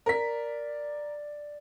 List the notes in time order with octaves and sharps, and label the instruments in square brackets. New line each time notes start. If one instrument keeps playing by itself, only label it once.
[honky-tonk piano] A#4 B6 [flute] D5